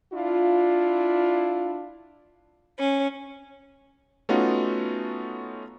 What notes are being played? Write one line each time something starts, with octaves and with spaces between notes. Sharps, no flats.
D4 E4 F4
C#4
A3 B3 C#4 D#4 F4 F#4